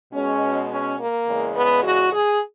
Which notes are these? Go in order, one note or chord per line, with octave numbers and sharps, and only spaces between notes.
B2 G#3 C#4
C#4
A#3
E2 C#3 G#3
B3
F#4
G#4